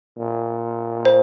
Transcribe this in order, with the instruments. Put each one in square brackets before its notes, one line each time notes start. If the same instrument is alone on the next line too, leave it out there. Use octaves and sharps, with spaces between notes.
[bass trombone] A#2
[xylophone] C5